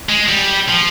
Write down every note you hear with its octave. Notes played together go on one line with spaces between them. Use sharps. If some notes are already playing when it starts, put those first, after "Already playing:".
G#3
G3
F3